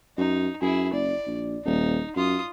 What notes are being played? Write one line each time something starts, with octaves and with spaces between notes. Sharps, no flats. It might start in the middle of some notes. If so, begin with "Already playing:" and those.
F#2 D#4
F#2 E4 G#4
F#1 D5
A#1
D#1 D#4
F#2 F4 D#6